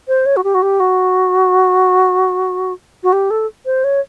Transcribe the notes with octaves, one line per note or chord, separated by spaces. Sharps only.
C5
C#5
F#4
G4
F#4
G4
F#4
F#4
G4
A4
C5
C#5